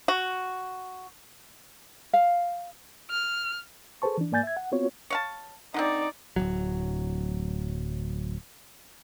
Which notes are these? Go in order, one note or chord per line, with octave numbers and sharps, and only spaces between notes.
F#4
F5
F6
G#4 A4 B4 C5 A5 C#6
E3 D4
G#2 A#3 D5 G#5 G6 A6
E5 G#6
F#5
B3 C4 F4 F#4 C#5
C#5 F5 A5
D3 B3 C4 D#4 D5
D1 B1 F#3